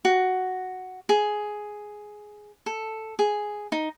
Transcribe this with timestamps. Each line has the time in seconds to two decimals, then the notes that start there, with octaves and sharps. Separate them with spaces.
0.05 F#4
1.09 G#4
2.66 A4
3.19 G#4
3.72 D#4